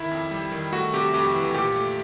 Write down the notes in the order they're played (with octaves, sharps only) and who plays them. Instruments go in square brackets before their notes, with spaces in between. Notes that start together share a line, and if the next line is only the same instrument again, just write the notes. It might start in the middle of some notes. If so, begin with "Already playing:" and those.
Already playing: [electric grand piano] D#3 E4
F2
G3
D#3
A3 F#4
C3 G4
F2 G4
E3
A#2 G4
A3